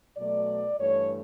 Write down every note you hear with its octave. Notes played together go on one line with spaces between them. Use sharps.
B2 F#3 A3 D5
G2 E3 A3 C#5